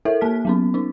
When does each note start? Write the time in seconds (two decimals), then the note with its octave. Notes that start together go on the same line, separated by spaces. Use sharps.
0.05 E4 A4 A#4 E5
0.21 A#3 A5 F6 B6
0.45 F#3 B3 C#4
0.74 C#4 D#4